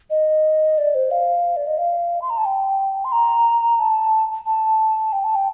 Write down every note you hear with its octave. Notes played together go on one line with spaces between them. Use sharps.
D#5
D5
C5
F5
D5
D#5
F5
C6
A#5
A5
G5
C6
A#5
A5
A5
G5
A5
G5